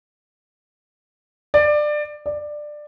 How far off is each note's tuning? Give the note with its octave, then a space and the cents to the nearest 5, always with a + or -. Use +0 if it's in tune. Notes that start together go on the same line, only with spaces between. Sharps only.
D5 +20
D5 +15